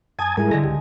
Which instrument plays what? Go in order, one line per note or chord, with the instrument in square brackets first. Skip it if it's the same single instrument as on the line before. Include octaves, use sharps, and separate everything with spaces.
[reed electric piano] F#2 [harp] G#5 [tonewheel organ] A5 D#6 G#6
[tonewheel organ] G#2 G#3 A#4 [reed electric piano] G3 E4 G#4 [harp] G#5
[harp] D3 G#3 [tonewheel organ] A4 A#6
[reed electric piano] C#2 [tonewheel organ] G4